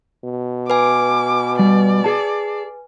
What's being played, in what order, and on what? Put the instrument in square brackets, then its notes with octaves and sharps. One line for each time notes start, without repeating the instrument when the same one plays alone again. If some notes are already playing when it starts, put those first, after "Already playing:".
[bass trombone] B2
[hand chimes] B4 G#5 [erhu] D6
[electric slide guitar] G3 [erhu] D5
[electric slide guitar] G#4 A5